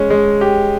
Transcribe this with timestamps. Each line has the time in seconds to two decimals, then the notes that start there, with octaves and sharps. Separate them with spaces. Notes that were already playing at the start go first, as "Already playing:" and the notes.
Already playing: G#3 C#4
0.10 G#3
0.41 G4